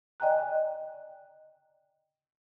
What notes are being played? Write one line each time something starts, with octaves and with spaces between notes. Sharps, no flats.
D5 D#5 G5 G#5 A#5 F#6